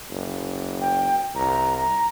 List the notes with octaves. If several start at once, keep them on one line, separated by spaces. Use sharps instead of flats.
F#1
G5
C2 A#5
A#5